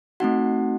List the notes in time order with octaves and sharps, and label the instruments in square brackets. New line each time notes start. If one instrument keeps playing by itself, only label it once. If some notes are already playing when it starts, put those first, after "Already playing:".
[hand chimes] A3 C4 D#4 F#4 F#5